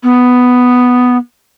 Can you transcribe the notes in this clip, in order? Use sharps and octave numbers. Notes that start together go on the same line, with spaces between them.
B3